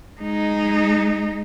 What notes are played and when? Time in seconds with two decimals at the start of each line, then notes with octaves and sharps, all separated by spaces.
0.21 G#3 D#4